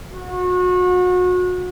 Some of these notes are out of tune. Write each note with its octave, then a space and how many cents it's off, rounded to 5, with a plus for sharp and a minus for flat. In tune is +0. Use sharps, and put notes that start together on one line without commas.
F#4 -35